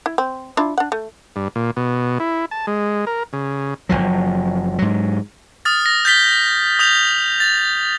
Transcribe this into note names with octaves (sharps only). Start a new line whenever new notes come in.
E4
C4
D4 E4 F4
D4 F#5
A3
G2
A#2
B2
E4
A5
G#3
A#4
C#3
F#1 C2 F3 F#3
G#2 F#3
D#6 F6 A6
A#6
G6 A6 B6 G7
D#6 G6 F7
A6